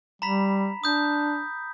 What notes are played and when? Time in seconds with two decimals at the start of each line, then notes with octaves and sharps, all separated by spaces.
0.22 G3 A#5 B5 B6
0.84 D4 D#6 G6